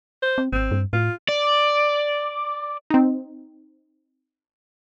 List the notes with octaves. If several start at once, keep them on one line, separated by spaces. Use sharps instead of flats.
C5
C4
G#1 C4
G2
A2 F4
D5
C4 D#4